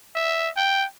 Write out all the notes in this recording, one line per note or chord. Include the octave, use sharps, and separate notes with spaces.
E5
G5